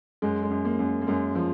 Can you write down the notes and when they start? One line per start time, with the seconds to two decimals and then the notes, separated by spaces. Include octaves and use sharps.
0.22 F#2 G#3
0.43 G#3
0.50 F#2
0.65 A#3
0.79 F#2
1.02 A#3
1.07 F#2 G#3
1.35 F3